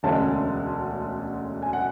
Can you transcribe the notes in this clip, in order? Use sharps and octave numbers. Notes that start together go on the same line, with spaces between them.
E1 D2 D3 G#3 C#4 A5
G#5
F#5